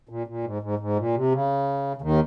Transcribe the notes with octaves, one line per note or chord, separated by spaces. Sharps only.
A#2
A#2
G#2
G#2
G#2
A#2
C3
C#3
C#3
D#2 D#3